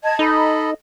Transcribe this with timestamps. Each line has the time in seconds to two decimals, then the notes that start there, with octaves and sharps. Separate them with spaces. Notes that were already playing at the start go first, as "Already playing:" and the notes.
0.04 D#5 A5 G#6
0.19 D#4 A4 D#5 B5